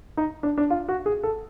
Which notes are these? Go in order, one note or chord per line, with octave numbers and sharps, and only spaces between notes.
D#4
D4
D4
F4
F#4
G#4
A4